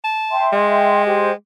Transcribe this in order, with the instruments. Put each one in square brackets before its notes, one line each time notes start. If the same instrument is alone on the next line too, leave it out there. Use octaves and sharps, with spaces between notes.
[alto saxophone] A5
[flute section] E5 G5 C6
[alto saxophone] G#3
[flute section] G4 C5 G5